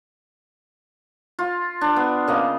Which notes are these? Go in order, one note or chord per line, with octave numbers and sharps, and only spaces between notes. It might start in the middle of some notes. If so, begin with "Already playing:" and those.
F4
D4
B3
C#3 A#3 D#5